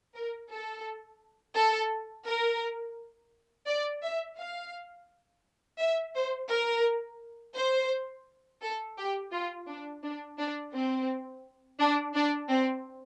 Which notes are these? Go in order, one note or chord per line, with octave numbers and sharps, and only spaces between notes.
A#4
A4
A4
A#4
D5
E5
F5
E5
C5
A#4
C5
A4
G4
F4
D4
D4
D4
C4
D4
D4
C4